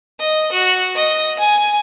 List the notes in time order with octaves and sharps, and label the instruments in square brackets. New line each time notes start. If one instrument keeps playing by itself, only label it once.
[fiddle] D#5
F#4
D#5
G#5